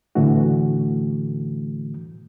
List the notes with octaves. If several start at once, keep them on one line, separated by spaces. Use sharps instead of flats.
A2 D3 E3 A3 F#4